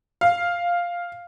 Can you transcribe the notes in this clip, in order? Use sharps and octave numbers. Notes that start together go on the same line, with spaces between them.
F5